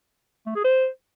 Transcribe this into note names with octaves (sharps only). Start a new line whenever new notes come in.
A3
G#4
C5